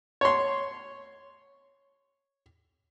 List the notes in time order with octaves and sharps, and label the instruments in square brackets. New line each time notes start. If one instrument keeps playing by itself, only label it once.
[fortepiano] C#5 C6